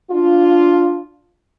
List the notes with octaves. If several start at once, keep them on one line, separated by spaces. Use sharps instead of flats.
D4 F4